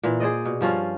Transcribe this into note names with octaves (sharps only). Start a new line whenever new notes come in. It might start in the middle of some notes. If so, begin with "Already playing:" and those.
A#2 E3
G#4 C5 D5 D#5
B2
G2 F3 C#4 F4